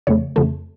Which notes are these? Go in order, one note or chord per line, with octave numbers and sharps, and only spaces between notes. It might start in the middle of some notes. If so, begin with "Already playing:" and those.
F2 C#3 A3 C#5
F2 C#3 A3